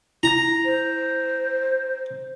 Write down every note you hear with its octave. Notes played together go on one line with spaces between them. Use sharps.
E4 A#5 A#6
C5